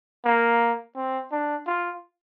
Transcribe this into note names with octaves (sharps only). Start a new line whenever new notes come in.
A#3
C4
D4
F4